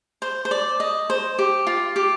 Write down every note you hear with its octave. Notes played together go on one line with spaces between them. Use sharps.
C5
C5
D5
D#5
C5
G4
F4
G4